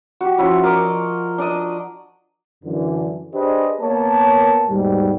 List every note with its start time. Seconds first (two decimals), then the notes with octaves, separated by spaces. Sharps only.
0.21 F#4 G4
0.38 F3 C#4 E4 F#4
0.63 A#4 D5 D#6
0.85 D#5
1.38 D4 D5 D#5
2.64 F#2 D3 E3
3.34 D4 G4 G#4 B4 C5 D#5
3.81 A#3 B3 A#4 C#5 A5
4.69 D#2 G#2 B2 G3